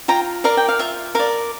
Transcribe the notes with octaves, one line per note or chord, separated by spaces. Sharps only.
F4 G5 A#5
A#4 D5 F5
G5
F5
F4 E5
A#4 D5 F5